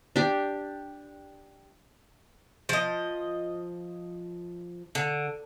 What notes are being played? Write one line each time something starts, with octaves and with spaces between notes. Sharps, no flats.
D4 G4
F3 D#5
D3